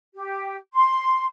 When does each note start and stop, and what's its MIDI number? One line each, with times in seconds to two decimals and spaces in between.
0.15 0.56 67
0.74 1.24 84